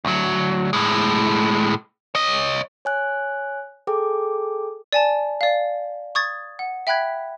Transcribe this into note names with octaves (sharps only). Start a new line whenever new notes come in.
D2 F#3
A2 G#3
C#5 D#5
C#5 G#5 F#6
G#4 A4 G5 D6
D5 G#5 A5
D5 F5
C#6 D#6 G#6 A6
F#5
E5 G5 B5 F#6 G#6 B6